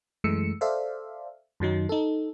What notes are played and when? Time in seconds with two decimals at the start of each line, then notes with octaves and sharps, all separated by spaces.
0.24 F#2 E3 G#3 A3 E6 C#7
0.61 A4 C5 D5 E5 F5
1.60 F#2 D#3 F#3 D#4
1.89 D#4 A4